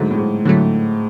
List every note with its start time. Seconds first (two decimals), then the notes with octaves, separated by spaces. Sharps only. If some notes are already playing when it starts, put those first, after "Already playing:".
Already playing: G#2 D3 F#3 A3
0.11 A2
0.18 G#2
0.45 A2 D3 F#3 A3